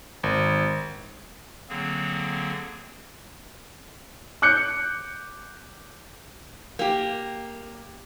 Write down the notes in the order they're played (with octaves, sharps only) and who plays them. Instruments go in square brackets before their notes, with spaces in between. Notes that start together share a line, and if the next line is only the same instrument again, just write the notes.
[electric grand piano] G#1
[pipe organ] D3 F#3 A#3 C4 G#4
[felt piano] D6 F#6 G6 C#7
[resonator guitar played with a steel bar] A#3 G4